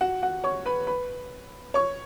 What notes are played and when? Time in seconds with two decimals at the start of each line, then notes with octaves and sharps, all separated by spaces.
0.01 F#4 F#5
0.22 F#4 F#5
0.44 C#5 C#6
0.66 B4 B5
0.87 B4 B5
1.74 C#5 C#6